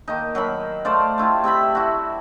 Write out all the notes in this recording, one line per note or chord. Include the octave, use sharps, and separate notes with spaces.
D#3 A#3 D#4
F#3 A#4 B5
A3 C5 D5 F5
A3 E4 F4 G4
C3 E5 G5 B5
E4 F#4